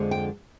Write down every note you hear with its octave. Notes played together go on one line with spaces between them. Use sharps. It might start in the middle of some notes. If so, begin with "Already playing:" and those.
Already playing: F2 D3 F3 G#3
G5